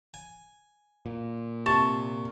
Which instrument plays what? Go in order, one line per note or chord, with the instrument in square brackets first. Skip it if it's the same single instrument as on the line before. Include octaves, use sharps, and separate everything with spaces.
[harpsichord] G#5
[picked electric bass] A#2
[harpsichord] C3 [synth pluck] A5 [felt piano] C#6